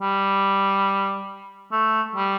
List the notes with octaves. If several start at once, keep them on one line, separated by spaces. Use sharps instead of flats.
G3
A3
G3